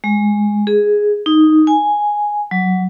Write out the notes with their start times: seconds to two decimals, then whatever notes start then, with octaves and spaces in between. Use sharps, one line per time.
0.04 G#3
0.67 G#4
1.26 D#4
1.67 G#5
2.51 F#3